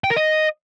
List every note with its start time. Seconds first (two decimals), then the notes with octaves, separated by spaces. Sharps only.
0.04 G5
0.10 A#4
0.16 D#5